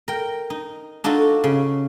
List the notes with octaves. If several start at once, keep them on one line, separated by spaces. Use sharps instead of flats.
A#4 G5
D#4
D4 D#4 F4 F#4 A4
C#3